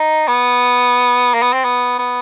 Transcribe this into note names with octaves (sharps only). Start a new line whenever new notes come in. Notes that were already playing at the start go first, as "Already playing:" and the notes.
Already playing: D#4
B3
A#3
B3
C4
B3
B3